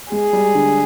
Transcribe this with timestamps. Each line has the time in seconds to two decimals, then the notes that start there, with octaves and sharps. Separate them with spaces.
0.12 G#3 G#4
0.33 G3
0.55 D3